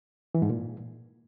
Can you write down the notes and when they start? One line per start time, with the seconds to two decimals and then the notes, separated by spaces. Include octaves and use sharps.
0.35 E3
0.42 G#2
0.49 A#2